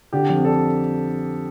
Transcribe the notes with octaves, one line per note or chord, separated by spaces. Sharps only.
D3 G4
F2
D3 A4